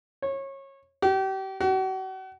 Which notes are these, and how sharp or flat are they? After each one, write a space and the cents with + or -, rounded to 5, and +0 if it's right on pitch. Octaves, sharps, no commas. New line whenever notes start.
C#5 -25
G4 -35
F#4 +40